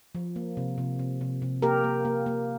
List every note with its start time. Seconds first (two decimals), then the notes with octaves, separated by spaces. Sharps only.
0.15 F3
0.36 A#3
0.57 C3
0.78 C3
0.99 C3
1.21 C3
1.42 C3
1.62 A#3 G4 A#4
1.84 A#3
2.05 A#3
2.26 A#3